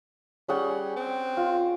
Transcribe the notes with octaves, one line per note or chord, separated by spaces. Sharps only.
G3 C#4 G#4 F#5
C4
F4